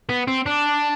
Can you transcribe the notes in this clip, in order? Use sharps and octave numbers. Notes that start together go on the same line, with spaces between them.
B3
C4
D4